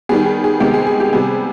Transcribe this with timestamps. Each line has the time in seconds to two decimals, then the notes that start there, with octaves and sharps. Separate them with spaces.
0.09 D#3 G3 B3 G#4
0.26 G#4
0.44 G#4
0.60 C3 D#3 G#3 B3 G4
0.74 G#4
0.87 G#4
1.00 G4
1.13 C3 G3 B3 G#4